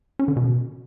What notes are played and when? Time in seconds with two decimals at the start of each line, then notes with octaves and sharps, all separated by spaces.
0.19 C#4
0.28 D3
0.37 B2